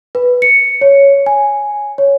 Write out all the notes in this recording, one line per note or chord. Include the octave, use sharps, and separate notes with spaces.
B4
C#7
C#5
G#5
C#5